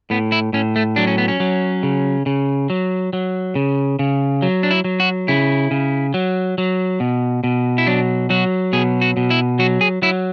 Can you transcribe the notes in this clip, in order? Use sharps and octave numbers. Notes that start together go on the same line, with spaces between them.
A2 B3
E4
A2 C#4
A3
F#3 D4
C#4
B3
C#4
F#3
C#3
C#3
F#3
F#3
C#3
C#3
F#3
D4
E4
F#3
F#4
C#3 E4
C#3
F#3
F#3
B2
B2
E4
F#3 D4
F#3 F#4
B2 G#4
F#4
B2
E4
F#3 F#4
G#4
F#3 E4